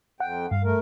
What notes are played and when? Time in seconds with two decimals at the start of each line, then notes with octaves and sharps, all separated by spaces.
0.20 F2 F#5 G5
0.51 G2 F5
0.64 A3 A#4